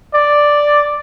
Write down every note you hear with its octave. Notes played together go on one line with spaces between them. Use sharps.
D5